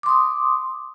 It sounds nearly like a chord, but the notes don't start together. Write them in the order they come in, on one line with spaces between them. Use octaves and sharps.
D6 C6 D#6